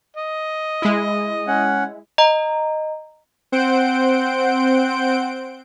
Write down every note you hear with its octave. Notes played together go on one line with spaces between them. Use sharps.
D#5
G#3 E4
C#4 F#5
D#5 A#5
C4 C5 F#5 G6 D7